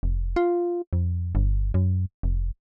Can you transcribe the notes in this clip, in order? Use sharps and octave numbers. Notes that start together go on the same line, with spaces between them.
F1
F4
F2
G1
F#2
F1